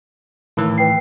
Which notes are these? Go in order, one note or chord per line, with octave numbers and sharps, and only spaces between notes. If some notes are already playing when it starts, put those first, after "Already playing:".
A2 D#3 E3 A#4
B4 G5 C7